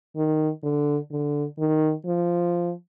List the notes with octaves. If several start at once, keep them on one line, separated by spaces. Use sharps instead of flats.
D#3
D3
D3
D#3
F3